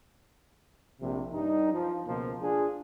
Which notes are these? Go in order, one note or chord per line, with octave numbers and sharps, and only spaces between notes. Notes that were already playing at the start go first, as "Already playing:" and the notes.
A#1 C3
G2 G3 D#4
F3
C#2 B2 F3 A#3
D4 F4 G#4